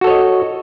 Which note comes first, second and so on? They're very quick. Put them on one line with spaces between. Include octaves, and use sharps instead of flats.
F#4 A4 C#5 D#5